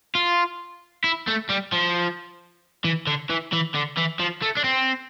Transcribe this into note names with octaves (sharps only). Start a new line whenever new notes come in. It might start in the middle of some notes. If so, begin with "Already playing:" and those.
F4
E4
A3
G3
F3
E3
D3
E3
E3
D3
E3
F3
A3
D4
C4